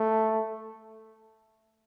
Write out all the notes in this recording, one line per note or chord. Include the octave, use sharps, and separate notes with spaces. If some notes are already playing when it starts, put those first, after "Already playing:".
Already playing: A3